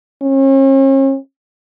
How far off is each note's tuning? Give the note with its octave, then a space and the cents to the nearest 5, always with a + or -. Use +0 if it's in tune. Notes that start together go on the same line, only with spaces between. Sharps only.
C#4 -40